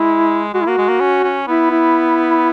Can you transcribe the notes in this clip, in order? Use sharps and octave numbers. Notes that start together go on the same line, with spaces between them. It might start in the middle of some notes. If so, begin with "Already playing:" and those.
Already playing: G#3 E4
G#3 F#4
E4
A#3 F#4
G#3
A#3
C#4
C#4
B3 E4
E4